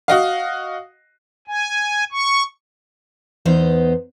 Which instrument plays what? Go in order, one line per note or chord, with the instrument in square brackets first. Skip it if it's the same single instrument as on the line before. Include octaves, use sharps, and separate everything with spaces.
[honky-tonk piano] F#4 D#5 F5
[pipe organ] G#5
C#6
[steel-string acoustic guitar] E2 B3 D#4 C5